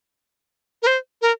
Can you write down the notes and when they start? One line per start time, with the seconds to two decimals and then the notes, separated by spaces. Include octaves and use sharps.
0.83 A#4
0.87 C5
1.22 A#4